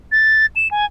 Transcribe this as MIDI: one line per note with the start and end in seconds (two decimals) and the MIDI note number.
0.12 0.46 93
0.56 0.68 100
0.71 0.86 80